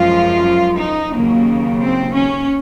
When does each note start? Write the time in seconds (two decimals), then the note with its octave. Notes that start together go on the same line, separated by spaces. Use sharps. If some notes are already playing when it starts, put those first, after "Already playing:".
Already playing: F#2 F3 G#3 F4
0.78 D#4
1.12 D#2 C#3 F#3 A#3
1.80 C4
2.14 C#4